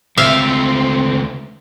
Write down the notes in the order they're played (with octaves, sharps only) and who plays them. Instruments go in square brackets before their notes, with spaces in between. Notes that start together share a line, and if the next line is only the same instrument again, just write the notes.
[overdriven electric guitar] C#2 A3 [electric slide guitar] C4 [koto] E5 F5